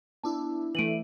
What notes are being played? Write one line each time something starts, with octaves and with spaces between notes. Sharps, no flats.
B3 D4 E4 A5
E3 A3 D7 D#7 F#7